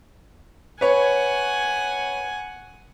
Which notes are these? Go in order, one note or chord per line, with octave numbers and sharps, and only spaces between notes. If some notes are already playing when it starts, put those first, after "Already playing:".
B4 C#5 F#5 G#5